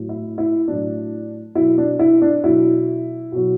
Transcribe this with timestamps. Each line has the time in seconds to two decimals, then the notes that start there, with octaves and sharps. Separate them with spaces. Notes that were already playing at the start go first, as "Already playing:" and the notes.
Already playing: A2 F#3
0.09 E4
0.38 E4
0.67 A2 F#3 D4
1.55 B2 F#3 E4
1.78 D4
1.99 E4
2.22 D4
2.44 B2 F#3 E4
3.32 B2 F#3